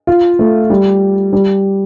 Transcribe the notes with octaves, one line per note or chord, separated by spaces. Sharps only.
F4
A3
G3
G3